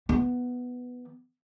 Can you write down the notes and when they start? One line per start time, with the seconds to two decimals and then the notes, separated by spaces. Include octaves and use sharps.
0.09 E3 B3